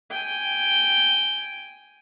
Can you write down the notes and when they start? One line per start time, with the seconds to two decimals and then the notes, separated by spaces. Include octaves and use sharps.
0.10 G5 G#5